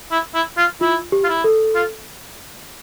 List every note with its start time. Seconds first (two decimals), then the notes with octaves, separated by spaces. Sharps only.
0.11 E4
0.34 E4
0.58 F4
0.81 E4 F4
1.12 G4
1.24 F4
1.29 E4
1.44 A4
1.75 F4